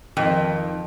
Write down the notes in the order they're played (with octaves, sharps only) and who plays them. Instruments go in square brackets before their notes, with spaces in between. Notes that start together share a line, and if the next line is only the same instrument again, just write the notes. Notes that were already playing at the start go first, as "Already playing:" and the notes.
[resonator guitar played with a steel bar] F2 [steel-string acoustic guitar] D#3 G5